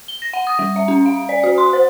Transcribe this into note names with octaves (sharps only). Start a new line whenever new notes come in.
G7
A#6
F#5
D#6
G3
E5
C#4
F5
D5
F#4
C6
C5